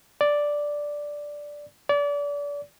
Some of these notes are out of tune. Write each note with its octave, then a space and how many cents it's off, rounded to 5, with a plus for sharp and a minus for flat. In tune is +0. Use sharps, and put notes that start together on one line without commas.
D5 +0
D5 -30